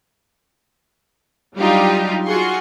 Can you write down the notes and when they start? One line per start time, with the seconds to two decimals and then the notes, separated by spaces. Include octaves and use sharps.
1.58 F#3 G3 D4 D#4 F4 G4
2.25 F4 F#4 G#4 C6 C#6